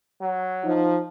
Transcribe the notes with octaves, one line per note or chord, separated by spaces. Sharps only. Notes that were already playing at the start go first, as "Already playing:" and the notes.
F#3
F3 D#4